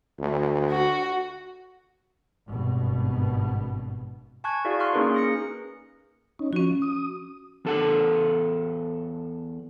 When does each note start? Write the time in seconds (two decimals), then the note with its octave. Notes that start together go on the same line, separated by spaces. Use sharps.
0.19 D2
0.71 F#4
2.50 G#1 G2 B2
4.44 G#5 A5 C#6 F#6 G#6
4.65 E4 F#4 G#4 D5 F5
4.80 C6 C#6 F6 F#6
4.93 A#3 C#4 D#4 G#4 A#4 B4
5.14 G#4 A#6 C#7
6.39 C#4 D#4
6.53 F3 C#4 F#4
6.82 D#6
7.65 E2 A4 F#5